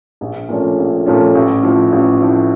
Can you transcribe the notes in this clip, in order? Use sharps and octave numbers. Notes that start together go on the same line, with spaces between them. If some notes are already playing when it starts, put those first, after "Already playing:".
A#1
A#2 F3 A3 C#4
A#1
A#2 F3 A3 C#4
A1
A2 F3
A1
A2 F3